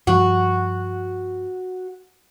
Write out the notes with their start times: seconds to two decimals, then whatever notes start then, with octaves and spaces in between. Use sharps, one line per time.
0.07 G2 F3 G3 F#4